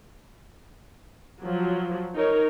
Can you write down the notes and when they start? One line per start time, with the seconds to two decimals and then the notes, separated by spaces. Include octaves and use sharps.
1.42 F3 F#3
2.15 D#4 A#4 C#5